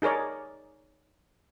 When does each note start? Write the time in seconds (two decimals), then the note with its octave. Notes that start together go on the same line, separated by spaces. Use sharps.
0.02 D#4 G#4 A#4 C#5 D5